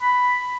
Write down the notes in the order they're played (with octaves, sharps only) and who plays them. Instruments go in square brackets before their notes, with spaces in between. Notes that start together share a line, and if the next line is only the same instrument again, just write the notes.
[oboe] B5